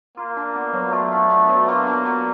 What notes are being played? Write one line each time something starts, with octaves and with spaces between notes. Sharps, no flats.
A#3 F4
D4
B3
F#3
A3 F4
D4
B3
F#3
A#3 F4
D4
B3